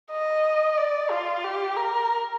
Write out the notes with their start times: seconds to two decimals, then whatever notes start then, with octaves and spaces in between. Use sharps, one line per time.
0.12 D#5
0.78 D5
1.11 F4
1.44 G4
1.77 A#4